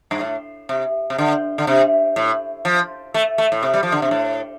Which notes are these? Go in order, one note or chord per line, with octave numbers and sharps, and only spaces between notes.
G2
A2
C3
C3
D3
D3
C3
A2
F3
A3
A3
A2
C3
G3
F3
D3
C3
A2